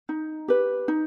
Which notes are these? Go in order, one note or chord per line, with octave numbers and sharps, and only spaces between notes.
D#4
G4 B4
D#4